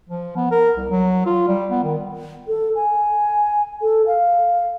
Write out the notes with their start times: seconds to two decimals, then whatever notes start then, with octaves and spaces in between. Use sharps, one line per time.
0.09 F3
0.37 B3
0.51 A#4
0.77 C2
0.91 F#3
1.26 F4
1.48 G3
1.71 B3
1.84 D#3
2.48 A4
2.76 G#5
3.82 A4
4.07 F5